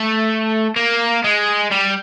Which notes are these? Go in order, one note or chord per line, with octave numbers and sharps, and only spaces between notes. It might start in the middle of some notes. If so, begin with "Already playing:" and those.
Already playing: A3
A#3
G#3
G3